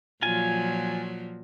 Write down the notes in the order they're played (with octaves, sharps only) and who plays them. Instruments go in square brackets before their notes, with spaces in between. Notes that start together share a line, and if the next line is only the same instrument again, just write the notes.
[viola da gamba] A#2 F3 F#3 [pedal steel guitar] F4 G#5